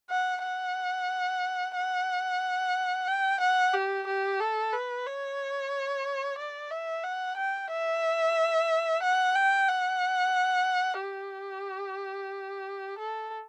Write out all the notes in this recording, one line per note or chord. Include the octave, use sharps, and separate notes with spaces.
F#5
F#5
F#5
G5
F#5
G4
G4
A4
B4
C#5
D5
E5
F#5
G5
E5
F#5
G5
F#5
G4
A4